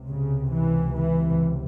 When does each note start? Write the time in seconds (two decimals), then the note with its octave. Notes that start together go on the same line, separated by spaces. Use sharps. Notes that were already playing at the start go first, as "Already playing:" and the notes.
Already playing: C#2 C3
0.09 C#3
0.53 E3
0.96 E3